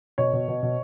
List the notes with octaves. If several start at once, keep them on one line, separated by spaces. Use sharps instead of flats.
B2 C#5
B2
B2
B2